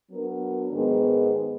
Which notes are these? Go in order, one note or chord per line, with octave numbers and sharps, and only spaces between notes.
F#3 B3 D4 F#4 A#4
G#2 D#3 G#3 B3